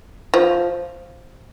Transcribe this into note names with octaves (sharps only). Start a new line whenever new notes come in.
F3